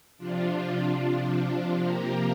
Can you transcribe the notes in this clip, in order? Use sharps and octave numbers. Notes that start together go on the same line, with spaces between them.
C3 F3 D4 F4
C3 F3 A#3 G4 A#4